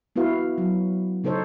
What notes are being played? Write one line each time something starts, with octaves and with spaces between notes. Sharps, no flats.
B3 E4 F#4 B4 F5
F#3
C#3 D#4 A4 C5 C#5